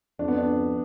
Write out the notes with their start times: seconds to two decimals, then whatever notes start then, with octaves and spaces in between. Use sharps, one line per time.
0.19 F2 D4
0.28 B3
0.37 D4